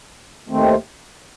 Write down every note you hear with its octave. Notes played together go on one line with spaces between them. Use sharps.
D#2 D#3 A3 C4